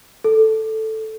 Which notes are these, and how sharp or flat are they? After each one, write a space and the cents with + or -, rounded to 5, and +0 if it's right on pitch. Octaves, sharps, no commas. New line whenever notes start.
A4 +0